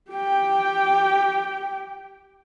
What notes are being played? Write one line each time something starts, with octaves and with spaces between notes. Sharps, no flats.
G4 G5